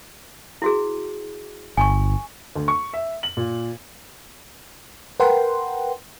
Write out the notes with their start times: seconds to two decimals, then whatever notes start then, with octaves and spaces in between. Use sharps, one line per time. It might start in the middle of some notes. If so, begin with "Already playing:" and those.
0.62 E4 F#4 G#4
1.77 G1 G#5 C#6
2.55 D2
2.68 C#6
2.94 E5
3.23 F#7
3.37 A#2
5.20 A#4 B4 F#5 G5 C6